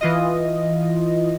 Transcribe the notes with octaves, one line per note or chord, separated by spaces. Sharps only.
E3 F4 D#5